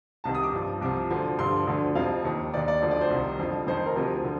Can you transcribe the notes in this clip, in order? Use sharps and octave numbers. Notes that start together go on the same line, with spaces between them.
C2 C3 D#3 A5
D#6
D6
G2 F3
C2 C3 F3 D6
D2 D3 F3
G2 D3 F3 C6
D2 D3 F3
F2 C3 F3 F5
D#2 D#3
D#2 D#3 D5
D5
D2 D3 F3
D5
C5
C2 C3 D#3
F2 D3 F3
F2 D#3 C5
C5
A#4
D2 C3 F3
D3 F3